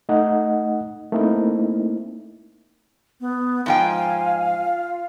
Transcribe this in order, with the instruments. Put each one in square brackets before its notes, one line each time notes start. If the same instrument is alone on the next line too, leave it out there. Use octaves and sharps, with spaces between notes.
[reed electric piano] A3 D#4 D#5 F#5
A3 A#3 C4 D#4 E4
[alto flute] B3
[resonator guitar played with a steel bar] G#2 F3 G5 [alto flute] F5 [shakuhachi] G#5
[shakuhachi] F4